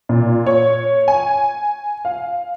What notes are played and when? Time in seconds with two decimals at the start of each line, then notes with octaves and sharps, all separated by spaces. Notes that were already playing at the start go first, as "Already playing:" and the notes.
0.09 A#2
0.46 C#5
1.08 G#5
2.05 F5